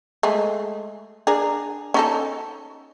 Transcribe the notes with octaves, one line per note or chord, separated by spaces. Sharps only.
G#3 A3 G#4
D4 G#4 A#4
C#4 D#4 A4